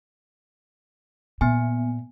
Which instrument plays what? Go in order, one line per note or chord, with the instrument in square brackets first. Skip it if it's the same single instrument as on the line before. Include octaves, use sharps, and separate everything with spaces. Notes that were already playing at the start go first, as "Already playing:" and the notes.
[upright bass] A#2 [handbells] B3 G#5